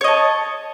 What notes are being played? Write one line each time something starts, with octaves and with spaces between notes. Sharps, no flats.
C#5 D#5 A5